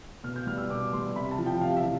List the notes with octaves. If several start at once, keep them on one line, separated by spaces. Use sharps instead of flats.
B2 F6
G6
G3 F6
E6
B2 D6
G3 C6
C3 B5
A5
F3
G5
C3 F5
E5
F3